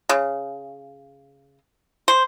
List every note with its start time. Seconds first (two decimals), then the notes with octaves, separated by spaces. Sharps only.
0.09 C#3
2.08 C5